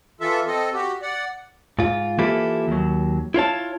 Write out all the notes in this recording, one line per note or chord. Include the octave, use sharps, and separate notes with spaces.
E3 F4 A4 E5
C4 A4 D#5
F#4 G4
D5 F#5
G#2 F4
E3 A#3 E4 F4 G4 A4
D#2 F#3
E4 F4 C#5 A5